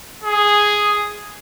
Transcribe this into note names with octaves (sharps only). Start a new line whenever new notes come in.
G#4